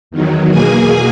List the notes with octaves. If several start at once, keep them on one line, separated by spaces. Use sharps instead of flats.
E2 D#3 F#3
E2 B2 A#3 G#4 G#5